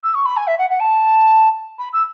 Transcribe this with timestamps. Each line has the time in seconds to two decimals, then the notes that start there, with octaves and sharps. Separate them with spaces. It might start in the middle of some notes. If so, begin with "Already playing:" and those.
0.04 E6
0.15 C#6
0.26 B5
0.37 G#5
0.47 E5
0.59 F#5
0.70 F#5
0.80 A5
1.79 B5
1.93 E6